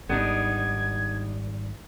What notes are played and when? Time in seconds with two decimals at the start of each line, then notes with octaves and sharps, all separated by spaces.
0.09 G#1 G3 B3 D4 D#4 G#6